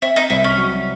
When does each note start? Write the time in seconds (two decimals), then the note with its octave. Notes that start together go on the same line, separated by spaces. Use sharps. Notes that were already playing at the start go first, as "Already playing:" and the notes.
0.02 C4 E4
0.16 D#4
0.30 C2 E4
0.44 C#4
0.58 F#3